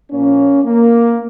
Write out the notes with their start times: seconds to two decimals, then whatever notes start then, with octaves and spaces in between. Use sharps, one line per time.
0.11 A#2 F3 A#3 C#4
0.64 A#3